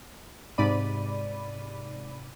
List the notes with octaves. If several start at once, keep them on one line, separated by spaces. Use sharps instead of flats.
G#2 C3 D5 B5 D#7